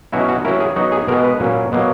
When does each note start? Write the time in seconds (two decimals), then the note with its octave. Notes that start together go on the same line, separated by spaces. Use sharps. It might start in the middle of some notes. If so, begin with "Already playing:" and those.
0.12 B2 F#3 C#4 E4 F#4
0.29 F#4
0.45 F#3 C#4 E4 A#4
0.60 G#4
0.76 F#3 B3 D#4 F#4
0.92 G#4
1.08 B2 G#3 B3 A#4
1.24 B4
1.40 A#2 F#3 C#4
1.72 B2 F#3 A#3